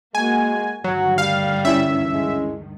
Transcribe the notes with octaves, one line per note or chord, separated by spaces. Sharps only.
G#3 A#3 F#4 G#5
D2 G2 D#3 F#3 F#4
G3 F5
C#4 E4 E5
G#3